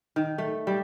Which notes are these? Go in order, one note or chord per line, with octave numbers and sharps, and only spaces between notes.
D#3
A3
G3